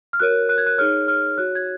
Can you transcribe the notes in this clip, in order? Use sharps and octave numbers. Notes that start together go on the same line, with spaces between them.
F6
F#4 A#4 C#5 F#6
F#6
G#6
F#6
D#4 G#4 C#5 F6
F6
F#4 C#5 F#6
G#6